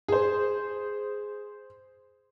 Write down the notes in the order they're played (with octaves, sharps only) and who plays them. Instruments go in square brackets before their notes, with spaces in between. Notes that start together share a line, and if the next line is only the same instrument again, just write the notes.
[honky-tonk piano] G#4 C5